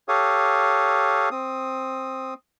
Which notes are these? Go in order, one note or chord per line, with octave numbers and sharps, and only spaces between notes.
G4 A4 C#5 F5 D#6
C4 D#6